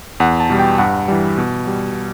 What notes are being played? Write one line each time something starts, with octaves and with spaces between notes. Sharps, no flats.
E2 F#5
A5
B2 G3
G5
G2 F#5
E3 G3
B2
G3